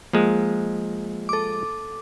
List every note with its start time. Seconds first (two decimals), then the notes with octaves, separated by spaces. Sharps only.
0.13 F3 G#3 A#3
1.29 A4 D6